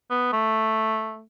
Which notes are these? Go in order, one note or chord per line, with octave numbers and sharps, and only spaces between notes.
B3
A3